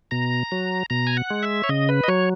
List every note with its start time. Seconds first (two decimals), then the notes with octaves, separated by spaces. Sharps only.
0.11 B2 A#5
0.52 F#3
0.90 B2 A#5
1.07 G#5
1.17 F#5
1.30 G#3
1.43 E5
1.64 C#5
1.69 C#3 D#5
1.89 B4
2.04 D#5
2.08 F#3 C#5